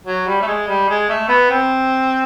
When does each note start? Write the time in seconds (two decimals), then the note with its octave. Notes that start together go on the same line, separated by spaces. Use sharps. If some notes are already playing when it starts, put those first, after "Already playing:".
0.06 F#3
0.27 G3
0.42 A3
0.47 G#3
0.68 G3
0.89 G#3
1.09 A3
1.28 B3
1.50 C4